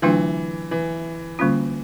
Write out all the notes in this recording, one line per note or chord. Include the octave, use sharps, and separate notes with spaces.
D3 E3 F#3 A3 D4 F4
E3
D3 G3 A#3 C#4 F4